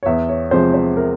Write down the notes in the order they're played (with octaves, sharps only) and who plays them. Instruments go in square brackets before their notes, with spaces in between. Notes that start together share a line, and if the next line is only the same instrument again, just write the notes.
[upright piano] C#5
E2 E5
C#5
C3 F3 G#3 C5
C5
A#4